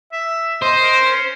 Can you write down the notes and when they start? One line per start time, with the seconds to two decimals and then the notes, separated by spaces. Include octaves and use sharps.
0.13 E5
0.62 C5 D#5
0.83 A#4
1.03 C#4